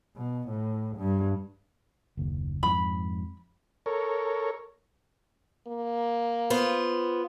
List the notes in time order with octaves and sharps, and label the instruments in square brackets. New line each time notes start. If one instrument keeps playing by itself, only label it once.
[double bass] B2
A2
G2
[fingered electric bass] F#1 D#2
[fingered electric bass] F2 G#2 [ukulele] B5
[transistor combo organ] A4 A#4 C#5
[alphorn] A#3
[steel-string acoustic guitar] B3 F4 C5